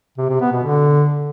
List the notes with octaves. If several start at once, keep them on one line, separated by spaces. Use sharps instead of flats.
C3
C3
B3
B2
D3